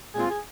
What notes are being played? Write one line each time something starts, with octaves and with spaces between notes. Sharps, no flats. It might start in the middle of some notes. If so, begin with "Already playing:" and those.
A#2 G#3 C4 F4 G#4
G#4